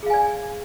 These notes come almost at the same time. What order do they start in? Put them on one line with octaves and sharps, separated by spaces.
G#4 F5 G#5 D5